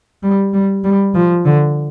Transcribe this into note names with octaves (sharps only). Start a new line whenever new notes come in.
G3
G3
G3
F3
D3